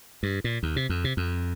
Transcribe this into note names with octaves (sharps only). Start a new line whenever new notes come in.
G2
A#2
D#2
C3
F2
C3
F2